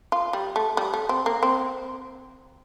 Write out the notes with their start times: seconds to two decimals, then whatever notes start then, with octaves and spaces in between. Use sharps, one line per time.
0.12 F4
0.33 G3
0.56 A3
0.77 G3
0.94 A3
1.09 C4
1.26 A#3
1.43 C4